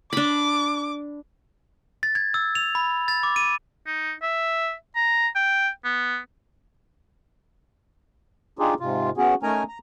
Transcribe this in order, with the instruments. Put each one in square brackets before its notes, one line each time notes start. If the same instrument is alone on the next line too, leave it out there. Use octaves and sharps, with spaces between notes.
[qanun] D4 B5 [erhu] D6
[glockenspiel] A6
G#6
E6
F7
B5
A6
D6
D#7
[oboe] D#4
E5
A#5
G5
B3
[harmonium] D4 D#4 F4 G4 G#4
G#2 C3 F4
B3 C#4 F#4 G#4
A3 C#4 D#4 A#4 G#5 A#5
A#5